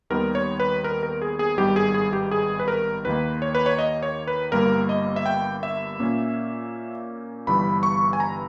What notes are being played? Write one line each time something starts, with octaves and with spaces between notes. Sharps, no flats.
D#2 D#3 G3 B3 A#4
C#5
B4
A#4
A#4
G#4
G#4
G#1 G2 D#3 G3 B3 G4
G#4
G#4
G4
G#4
B4
A#4
D#2 D#3 A#3 B4
C#5
B4
C#5
D#5
C#5
B4
G1 G2 G3 A#3 A#4
D#5
E5
G5
E5
A#2 A#3 C#4
G1 G2 E3 G3 B5
C#6
G#5
A#5